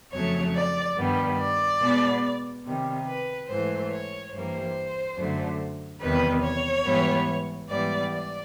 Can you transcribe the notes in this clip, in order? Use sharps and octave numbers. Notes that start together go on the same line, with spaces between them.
F2 C#3 F#3 A3 C#5
D5
G2 D#3 G3 B3
D5
B2 G#3 B3
C3 D#3 G3
B4
G#2 E3 A3 C5
C#5
G2 E3 G3 A#3 C5
F#2 D3 F#3 A3
E2 C3 D#3 G3 B4
C#5
G#2 E3 G3 B3
G#2 E3 G3 B3 D5
D5